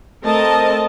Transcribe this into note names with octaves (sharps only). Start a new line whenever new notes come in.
A3 C4 A#4 D#5 A5